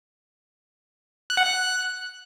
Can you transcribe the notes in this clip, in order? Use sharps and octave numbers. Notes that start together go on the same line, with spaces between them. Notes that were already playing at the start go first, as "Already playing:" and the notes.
F#6
F#5
F#6